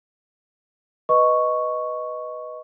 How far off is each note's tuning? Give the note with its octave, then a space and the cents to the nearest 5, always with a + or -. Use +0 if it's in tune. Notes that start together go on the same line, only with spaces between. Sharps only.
B4 +0 D#5 +0 C#6 +0